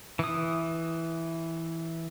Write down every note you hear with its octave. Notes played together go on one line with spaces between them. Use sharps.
E3 D#6